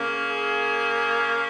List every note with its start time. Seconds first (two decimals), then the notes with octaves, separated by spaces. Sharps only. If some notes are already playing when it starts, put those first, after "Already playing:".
Already playing: C#3 A#3 C#4
0.31 G#4